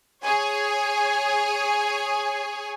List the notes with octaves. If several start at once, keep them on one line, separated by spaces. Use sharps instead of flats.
G#4 C#5 G#5